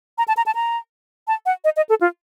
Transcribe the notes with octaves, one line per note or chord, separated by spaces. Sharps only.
A#5
A5
A#5
A5
A#5
A5
F#5
D#5
D#5
A4
F4